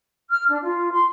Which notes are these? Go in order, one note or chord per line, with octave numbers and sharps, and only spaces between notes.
F6
D4
F4
C6